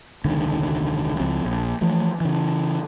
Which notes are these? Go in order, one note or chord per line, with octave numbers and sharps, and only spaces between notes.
E1 C#2 D3 D#3
C#2 F3 C4
A#1
E3 F3 A3
C#3 E3